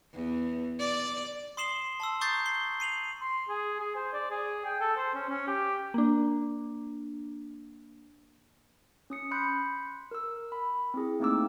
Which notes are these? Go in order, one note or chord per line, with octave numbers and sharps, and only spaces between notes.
E2
D5
C6 D#6 C7 E7 F#7 G7
A5 C6 E6
A#5 C#6 D#6 G6 A6 C7
C7 G7
C7 D#7 F7 F#7
C6
G#4
G#4
C5
D5
G#4
G5
A4
C5
C#4
C#4
G4
A#3 D4
C#4 D#6 C#7
B5 C6 F#6 G6 C#7
A#4 E6
B5
C4 E4 G#4
A3 A#3 C4 D#4 D6 E6